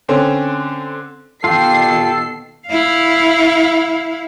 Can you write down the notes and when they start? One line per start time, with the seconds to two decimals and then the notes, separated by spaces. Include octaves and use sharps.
0.08 D3 C4 C#4
1.44 B2 D#3 F4 G4 A4 C7
2.68 E4 F5